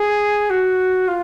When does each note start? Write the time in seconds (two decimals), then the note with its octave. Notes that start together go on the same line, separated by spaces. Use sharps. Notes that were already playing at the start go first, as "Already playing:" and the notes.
Already playing: G#4
0.49 F#4
1.07 F4